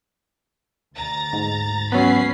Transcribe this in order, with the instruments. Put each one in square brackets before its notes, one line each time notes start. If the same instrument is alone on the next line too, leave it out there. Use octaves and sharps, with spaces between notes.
[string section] D2 A#5 A6
[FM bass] G#2
[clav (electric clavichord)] F#3 B3 [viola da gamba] C#4 [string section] B5 C7